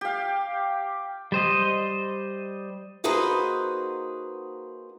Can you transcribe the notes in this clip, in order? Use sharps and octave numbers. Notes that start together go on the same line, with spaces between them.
G4 F5
G3 C5 D#5
A#3 D#4 F#4 G#4 B4 C5